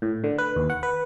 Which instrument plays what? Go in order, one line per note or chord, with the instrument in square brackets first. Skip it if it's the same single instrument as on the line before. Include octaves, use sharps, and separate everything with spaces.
[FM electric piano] A2
D3
B4
D#2
F#5
B4